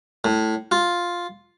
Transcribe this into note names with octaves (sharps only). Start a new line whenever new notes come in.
A2
F4